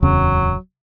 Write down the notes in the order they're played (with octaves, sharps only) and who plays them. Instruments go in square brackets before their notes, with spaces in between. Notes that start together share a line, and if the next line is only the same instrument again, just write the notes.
[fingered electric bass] D1 E2 C#3 [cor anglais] F#3